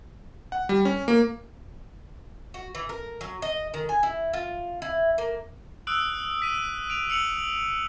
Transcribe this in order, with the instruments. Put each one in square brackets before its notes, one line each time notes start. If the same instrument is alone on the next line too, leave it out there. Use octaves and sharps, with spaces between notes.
[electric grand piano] F#5
G3
C#4
A#3
[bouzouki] F#4
E3
A#4
F#3
D#5
D#3
G#5
E4
F4
E4
A#3
[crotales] D#6 E6 F#6 D7 F#7
B6 D#7
D7 F7
E6 C#7 F7 F#7